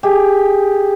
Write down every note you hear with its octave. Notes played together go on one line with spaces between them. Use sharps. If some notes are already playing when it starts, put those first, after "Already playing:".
G4 G#4